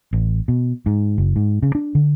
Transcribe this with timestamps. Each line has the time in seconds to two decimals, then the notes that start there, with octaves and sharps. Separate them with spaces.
0.13 A1
0.48 B2
0.86 G#2
1.18 F#1
1.36 G#2
1.62 C#3
1.75 D4
1.95 D3